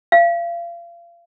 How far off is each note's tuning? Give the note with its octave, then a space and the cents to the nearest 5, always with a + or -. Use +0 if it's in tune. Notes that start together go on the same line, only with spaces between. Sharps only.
F5 -35